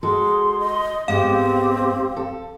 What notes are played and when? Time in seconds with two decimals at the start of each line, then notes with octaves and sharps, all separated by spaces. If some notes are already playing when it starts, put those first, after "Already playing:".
0.03 G#3 F#4 G#4 A4 C6
0.59 D#5
1.08 G#2 G#3 B3 C4 G4 F5
2.16 A4